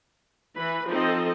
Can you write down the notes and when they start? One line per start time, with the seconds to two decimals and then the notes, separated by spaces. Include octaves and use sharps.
0.57 E3 B4 B5
0.89 F3 C4 D#4 A4 D#5